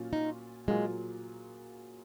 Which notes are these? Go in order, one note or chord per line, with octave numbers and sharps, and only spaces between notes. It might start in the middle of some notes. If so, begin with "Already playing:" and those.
Already playing: A#2 F#3 C#4 F4
D#4
A#2 F#3 G#3 A#3 F4 G#4